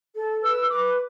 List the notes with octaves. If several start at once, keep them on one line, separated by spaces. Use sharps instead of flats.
A4
B4 E6
B4 D6